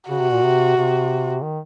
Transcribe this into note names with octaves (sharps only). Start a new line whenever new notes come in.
C#3 F#4
C3
A#2
C3
C3
D#3